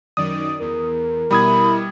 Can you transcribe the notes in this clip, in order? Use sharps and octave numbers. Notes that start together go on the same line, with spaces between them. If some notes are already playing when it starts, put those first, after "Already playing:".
F#2 D#3 D5 D#6
E2 A#4
B2 G3 E4 B5 D#6 G#6